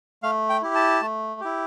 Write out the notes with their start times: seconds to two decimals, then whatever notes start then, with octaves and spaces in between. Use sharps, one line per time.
0.23 A3 F5
0.49 G5
0.62 E4 G4
0.75 A5
1.02 A3
1.41 E4 G4